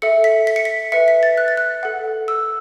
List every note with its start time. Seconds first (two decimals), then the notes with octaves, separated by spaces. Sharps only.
0.02 A4 E5 C#7
0.24 B6
0.47 B6
0.56 C#7
0.65 B6
0.92 B4 E5 C#7
1.08 B6
1.23 A6
1.38 F#6
1.48 A6
1.57 F#6
1.83 A4 F#5
2.28 E6